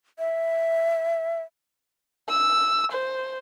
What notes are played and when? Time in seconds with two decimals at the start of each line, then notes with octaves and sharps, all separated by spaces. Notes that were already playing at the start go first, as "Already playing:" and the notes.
0.19 E5
2.29 E6
2.92 C5